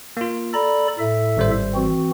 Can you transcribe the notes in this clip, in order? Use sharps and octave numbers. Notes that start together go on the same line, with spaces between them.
A#3 F4
A4 D5 A#5 B5
A2 A4 E5
G#1 G3 C5
E3 C4 F#4